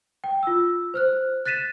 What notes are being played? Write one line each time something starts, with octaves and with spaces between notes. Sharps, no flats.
G5
F4 E6
C5 F6 F#6
F#6 A6 B6 D#7 E7